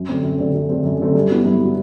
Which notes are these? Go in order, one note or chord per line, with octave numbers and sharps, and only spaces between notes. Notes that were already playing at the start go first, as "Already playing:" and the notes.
Already playing: F#2
D3 A3 C4
F#2
D3 A3 C4
F#2
D3 A3 C4
F#2
D3 A3 C4
G2
F#3 B3 E4
G2
F#3 B3 E4